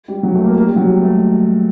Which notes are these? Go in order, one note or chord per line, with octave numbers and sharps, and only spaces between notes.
G3
F#3
A3
A#3
A#3
G3
F#3
G3
A3